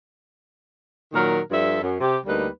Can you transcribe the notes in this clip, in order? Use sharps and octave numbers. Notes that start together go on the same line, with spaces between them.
A#2 D#3 F#3 A#4
G2 F3 G3 A4 E5
F#2
C3 G4
D2 G3 A#3 D#4 B4